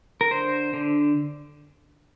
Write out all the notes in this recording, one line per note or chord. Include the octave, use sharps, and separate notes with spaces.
A#4
D3 C5
D3